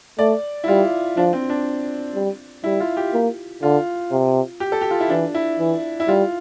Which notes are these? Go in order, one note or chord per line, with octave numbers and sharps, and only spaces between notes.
A3 D5
E4
G3 F4
F3 D4
C4
D4
G3
G3 E4
F4
G4
A#3
D3 F4
C3
G4
A4
G4
F4
E4
E3 D4
E4
E3
E4
G3 F4